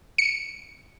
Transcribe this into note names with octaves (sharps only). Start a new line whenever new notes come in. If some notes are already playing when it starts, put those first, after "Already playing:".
C#7